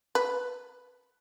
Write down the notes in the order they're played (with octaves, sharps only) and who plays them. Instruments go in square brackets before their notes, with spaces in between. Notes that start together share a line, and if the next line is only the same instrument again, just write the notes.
[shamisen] B4